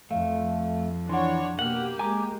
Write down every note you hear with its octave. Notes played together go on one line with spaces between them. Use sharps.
F2 F3 A3 F5
E3 D4 C#5 F#5 C6
B2 A#3 G4 F#5 F6 F#7
G#3 G#5 A#5 D6